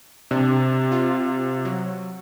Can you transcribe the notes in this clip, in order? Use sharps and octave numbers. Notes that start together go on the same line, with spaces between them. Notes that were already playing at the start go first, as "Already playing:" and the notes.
C3 D4
F4
F#3